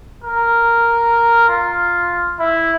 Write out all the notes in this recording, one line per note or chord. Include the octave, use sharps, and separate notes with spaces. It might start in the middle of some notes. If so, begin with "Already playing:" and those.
A#4
F4
E4